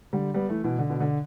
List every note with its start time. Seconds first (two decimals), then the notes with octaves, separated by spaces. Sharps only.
0.13 D3 G3
0.34 G3 B3
0.49 E3 A3
0.64 B2 E3
0.79 D3
0.90 B2
1.01 D3